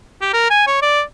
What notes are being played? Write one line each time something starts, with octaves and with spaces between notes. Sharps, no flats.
G4
A#4
G#5
C#5
D5